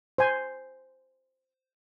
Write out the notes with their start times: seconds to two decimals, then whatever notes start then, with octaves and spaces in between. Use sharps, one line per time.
0.18 C5 G#5